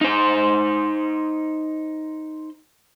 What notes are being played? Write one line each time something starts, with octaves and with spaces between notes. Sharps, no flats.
D#4 C5